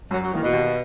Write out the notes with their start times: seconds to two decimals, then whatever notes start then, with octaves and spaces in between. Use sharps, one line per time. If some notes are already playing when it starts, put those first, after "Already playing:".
0.11 F#2 F#3
0.22 F#3
0.32 D#3 E3 A#3
0.43 B2
0.53 D#2